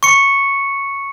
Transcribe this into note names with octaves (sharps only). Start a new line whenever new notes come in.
C#6 C#7